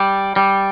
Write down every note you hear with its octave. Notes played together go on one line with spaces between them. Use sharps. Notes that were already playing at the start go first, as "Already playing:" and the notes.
Already playing: G3
G3